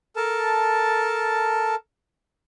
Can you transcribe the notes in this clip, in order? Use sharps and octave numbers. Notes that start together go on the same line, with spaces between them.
A4 A#4 A5